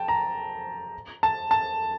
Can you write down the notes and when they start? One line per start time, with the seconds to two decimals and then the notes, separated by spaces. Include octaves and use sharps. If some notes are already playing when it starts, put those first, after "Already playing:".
Already playing: G5 A5
0.08 A#5
1.23 A5
1.51 A5